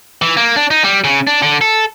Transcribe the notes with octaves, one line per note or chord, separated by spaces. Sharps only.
E3
A#3
D4
D#4
G3
C#3
D4
D3
A4